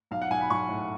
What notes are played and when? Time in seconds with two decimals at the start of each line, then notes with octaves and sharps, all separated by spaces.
0.11 B1 F5
0.22 F#5
0.30 B1 G#5
0.41 B5
0.50 B1 C#6
0.69 A2